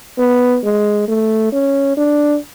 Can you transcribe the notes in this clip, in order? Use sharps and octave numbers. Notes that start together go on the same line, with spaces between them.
B3
G#3
A3
C#4
D4